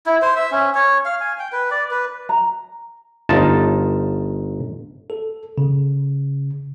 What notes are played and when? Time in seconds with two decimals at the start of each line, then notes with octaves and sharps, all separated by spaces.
0.06 E4
0.22 C5
0.36 E5
0.51 C#4
0.75 C#5
1.05 F5
1.21 G#5
1.39 G5
1.52 B4
1.71 D5
1.91 B4
2.29 A#5
3.29 G1 D#4 F4 A5
5.10 A4
5.58 C#3